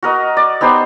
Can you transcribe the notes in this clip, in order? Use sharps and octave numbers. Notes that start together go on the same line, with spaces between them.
F#4 A#4 D#5
D5
B3 D#4 G4 C5